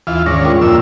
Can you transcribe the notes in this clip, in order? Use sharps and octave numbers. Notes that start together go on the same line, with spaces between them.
D#2 E3 F4 E5
G#2 D#3 C#4 D4 A#6
F4 A#4 G5
F2 A#2 F3 F4 E6